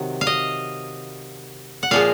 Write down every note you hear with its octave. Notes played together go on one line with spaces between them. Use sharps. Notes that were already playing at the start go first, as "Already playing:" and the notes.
Already playing: C3 D#3 F#3
F5
D#5
F#5
A#2 F3 G#3 F5